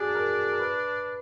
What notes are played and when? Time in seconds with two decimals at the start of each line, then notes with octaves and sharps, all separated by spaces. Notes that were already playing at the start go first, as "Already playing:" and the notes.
Already playing: D4 F#4 G#4
0.15 A#4
0.52 A#4
0.59 B4